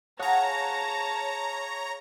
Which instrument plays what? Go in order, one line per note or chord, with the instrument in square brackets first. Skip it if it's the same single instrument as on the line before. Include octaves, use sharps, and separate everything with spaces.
[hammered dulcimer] G#4 F5 F#5 [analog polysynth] C#5 A#5 [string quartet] A5 A#6